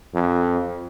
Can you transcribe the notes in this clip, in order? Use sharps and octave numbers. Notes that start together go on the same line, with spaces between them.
F2